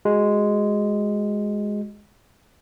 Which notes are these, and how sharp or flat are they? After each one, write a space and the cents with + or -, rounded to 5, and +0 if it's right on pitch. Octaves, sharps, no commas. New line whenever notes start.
G#3 +0 F#4 +10